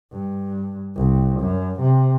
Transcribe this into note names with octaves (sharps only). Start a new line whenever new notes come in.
G2
C2
F#2
C3